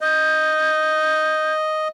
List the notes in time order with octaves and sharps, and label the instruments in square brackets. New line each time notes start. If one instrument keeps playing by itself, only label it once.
[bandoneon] D#5 [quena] G6